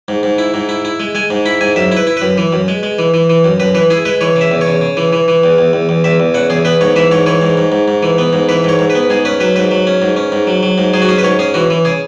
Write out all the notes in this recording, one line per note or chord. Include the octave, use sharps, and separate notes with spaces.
G#2
G#2
E4
G#2
E4
E4
G#3
G#3 G#5
G#2
E4 B5
G#2 G#5
F#2 E5
E4 B4
E4
F#2 B4
E3
F#2
G#3
G#3
E3
E3
E3
F#2
F#2 B4
E3 B4
E4 G#4
G#3 B4
E3 C#5
C#3
E5
E2
C#5
C#3
C#3
E3
E3
E3
E2
E2
E2
E2
E2 E5
E2
C#3 F#5
E2 G#4
B3 B4
G#2 C#5
E3 E5
G#2 C#5
E3 C#5
G#2
G#2
G#2
G#2
E3
B3
G#2
E3 B4
G#2 C#5
G#2
B4
B3
G#2 G#4
C#4 B4
F#3 B4
G#2 B4
F#3
C#4
G#2
C#4
G#2
F#3
F#3
G#2
F#3 G#4
F#4
C#4 G#4
B4
G#2 C#5
C#4 G#4
E3 F#4
E3
C#3 G#4